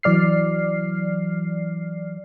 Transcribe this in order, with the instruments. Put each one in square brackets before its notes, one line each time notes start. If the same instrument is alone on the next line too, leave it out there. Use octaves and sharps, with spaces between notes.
[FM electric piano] E3 F#3 D5 F6 C7